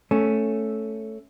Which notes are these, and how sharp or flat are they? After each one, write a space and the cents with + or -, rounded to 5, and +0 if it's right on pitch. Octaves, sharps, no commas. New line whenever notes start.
A3 +0 C#4 +0